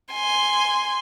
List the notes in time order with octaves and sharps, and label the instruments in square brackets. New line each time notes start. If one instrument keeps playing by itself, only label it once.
[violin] G#5 C6